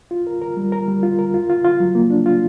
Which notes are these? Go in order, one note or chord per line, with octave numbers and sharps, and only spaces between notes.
F4
A#4
A#4
G3
A#4
G3
F4
A#4
F4
F4
F4
F#3
A#3
D4
F4